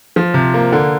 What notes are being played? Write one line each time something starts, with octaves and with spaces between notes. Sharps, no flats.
F3
C3
A#3
D3